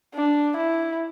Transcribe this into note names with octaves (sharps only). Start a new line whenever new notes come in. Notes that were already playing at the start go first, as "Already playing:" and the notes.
D4
E4